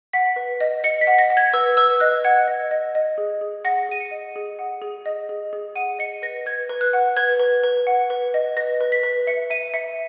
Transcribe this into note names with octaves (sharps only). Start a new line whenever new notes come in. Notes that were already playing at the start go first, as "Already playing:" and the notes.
F#5 B6
B4
D#5
D#5 C#7
B6
F#5
A#6
F#5
G#6
B4 E6
B4 E6
D#5 F#6
F#5 G#6
D#5
D#5
D#5
G#4
G#4
F#5 A#6
G#4 D#7
C#7
D#5
G#4
F#5
G#4
D#5
G#4
G#4
F#5 D#7
D#5 C#7
B4 A#6
B4 G#6
B4
F#6
F#5
B4 G#6
B4
B4
F#5
B4
D#5
B4 A#6
B4
B6
B4
E5 C#7
E5 D#7
E5 C#7